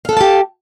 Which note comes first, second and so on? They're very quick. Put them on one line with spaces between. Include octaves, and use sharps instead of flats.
F5 A4 F#5 A5 G4